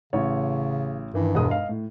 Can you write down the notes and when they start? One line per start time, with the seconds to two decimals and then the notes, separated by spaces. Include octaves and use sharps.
0.13 A1 C#3 C#5
1.14 G2 D#3 E3
1.35 E1 G#3 D#6
1.48 D#5 F5
1.69 A2